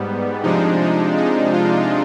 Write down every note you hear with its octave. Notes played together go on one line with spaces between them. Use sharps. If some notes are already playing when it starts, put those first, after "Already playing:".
Already playing: G#2 G3 B3
C3 F3 G#3 D4 D#4
D#4
D#4
F4